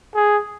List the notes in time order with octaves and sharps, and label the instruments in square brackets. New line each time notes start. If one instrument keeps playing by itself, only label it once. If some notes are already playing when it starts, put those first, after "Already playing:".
[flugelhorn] G#4